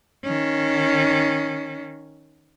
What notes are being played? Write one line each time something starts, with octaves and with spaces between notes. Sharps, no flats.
D#3 C#4